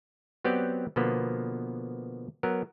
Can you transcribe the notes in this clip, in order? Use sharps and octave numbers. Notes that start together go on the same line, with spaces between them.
F#3 B3 C4 G4 D5 G5
B2 D3 F3 A#3 B3
F#3 B3 A#4